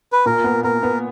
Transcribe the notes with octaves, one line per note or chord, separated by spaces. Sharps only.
B4
A#2 A#4
B3
B3 A#4
B3